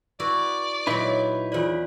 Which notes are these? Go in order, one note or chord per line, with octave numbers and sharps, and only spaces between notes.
E4 F#4 B4 D5
A#2 F#3 D#4 E4 B4
E2 F4 C5 D5 B5